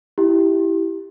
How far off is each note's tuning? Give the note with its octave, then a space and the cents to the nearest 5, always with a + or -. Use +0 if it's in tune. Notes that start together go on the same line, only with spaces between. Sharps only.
E4 +0 G4 -5